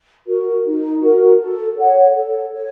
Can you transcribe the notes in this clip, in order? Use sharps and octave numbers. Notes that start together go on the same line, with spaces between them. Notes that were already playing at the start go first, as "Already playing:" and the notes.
F#4 A#4
D#4
F#4 A#4
A4
C#5 F#5
A4
C#5